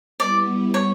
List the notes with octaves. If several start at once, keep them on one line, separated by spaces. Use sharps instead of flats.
G3 B3 E4 D5
C#5